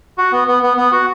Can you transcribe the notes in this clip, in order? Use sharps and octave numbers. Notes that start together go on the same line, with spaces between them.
F#4
B3
B3
B3
B3
F#4